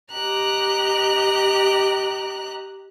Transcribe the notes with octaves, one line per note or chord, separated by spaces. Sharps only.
G4 D#5 A#5 F#6